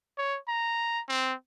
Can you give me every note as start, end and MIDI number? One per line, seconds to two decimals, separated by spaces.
0.18 0.38 73
0.48 1.01 82
1.09 1.34 60